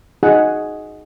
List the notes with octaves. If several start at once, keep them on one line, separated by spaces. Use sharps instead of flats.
D#4 F#4 G#4 D#5 F#5